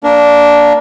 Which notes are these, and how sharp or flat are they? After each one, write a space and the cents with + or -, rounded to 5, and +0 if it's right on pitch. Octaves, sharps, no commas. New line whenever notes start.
A#3 +0 D4 -10 A#4 +0